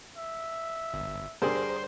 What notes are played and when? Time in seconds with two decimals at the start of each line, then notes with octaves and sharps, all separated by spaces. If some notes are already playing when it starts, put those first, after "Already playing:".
0.16 E5
0.94 G1
1.42 G2 D3 G3 G#4 A#4 C5 C6